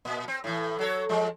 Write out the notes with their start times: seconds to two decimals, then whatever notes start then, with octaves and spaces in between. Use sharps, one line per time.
0.05 A#2
0.28 C4
0.44 A2 E3
0.79 F#3 A4 C#5
1.09 F3 G#3